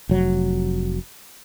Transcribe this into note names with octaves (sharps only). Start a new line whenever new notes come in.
F1 F#3